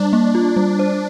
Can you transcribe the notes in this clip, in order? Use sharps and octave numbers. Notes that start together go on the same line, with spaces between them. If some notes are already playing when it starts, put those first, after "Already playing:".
Already playing: G3 D4
A#3
F4
G3
C5